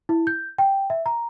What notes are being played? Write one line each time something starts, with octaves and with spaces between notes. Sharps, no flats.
E4
G6
G5
E5
A#5